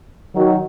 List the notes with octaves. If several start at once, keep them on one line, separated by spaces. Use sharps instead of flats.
D#3 F#3